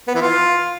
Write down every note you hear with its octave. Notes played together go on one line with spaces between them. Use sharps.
B3
E3
F4